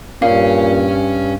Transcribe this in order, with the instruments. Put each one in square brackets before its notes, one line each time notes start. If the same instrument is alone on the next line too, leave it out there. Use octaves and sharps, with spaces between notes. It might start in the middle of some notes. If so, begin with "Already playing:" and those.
[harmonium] G2 [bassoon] A#2 [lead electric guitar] C#4 C#5 [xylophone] F5